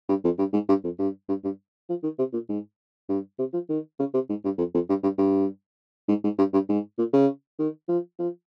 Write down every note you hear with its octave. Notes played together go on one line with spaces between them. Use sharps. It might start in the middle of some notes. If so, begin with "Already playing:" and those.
G2
F2
G2
G#2
G2
F2
G2
G2
G2
F3
D#3
C3
A#2
G#2
G2
C3
F3
D#3
C#3
C3
G#2
G2
F2
F2
G2
G2
G2
G#2
G#2
G2
G2
G#2
A#2
C#3
D#3
F3
F3